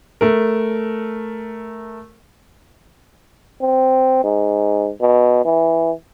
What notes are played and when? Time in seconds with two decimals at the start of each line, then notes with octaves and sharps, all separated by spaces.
0.21 A3 A#4
3.61 C4
4.24 G#2
5.00 B2
5.45 E3